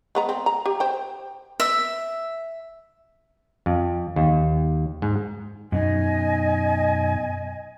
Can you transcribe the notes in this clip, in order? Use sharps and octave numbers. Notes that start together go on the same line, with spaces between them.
G#3 B3 A#5
C4
A#5
G4
C5 G5
E5
F2
D#2
G#2
F#2 B2 D#4 D#5 G#5